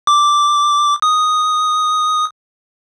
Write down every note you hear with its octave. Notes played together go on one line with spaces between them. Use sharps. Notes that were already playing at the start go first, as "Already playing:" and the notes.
D6
D#6